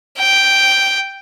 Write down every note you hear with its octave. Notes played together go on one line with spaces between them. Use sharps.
G5